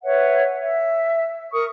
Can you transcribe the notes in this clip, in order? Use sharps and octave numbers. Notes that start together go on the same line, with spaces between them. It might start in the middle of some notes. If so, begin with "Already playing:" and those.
B4 C#5 E5 F#5
E5
A#4 C#6 D#6